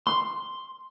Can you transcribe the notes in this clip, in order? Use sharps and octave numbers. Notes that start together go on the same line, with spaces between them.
C6